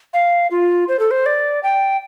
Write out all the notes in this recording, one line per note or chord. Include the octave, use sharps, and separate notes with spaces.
F5
F4
C5
A4
C5
D5
G5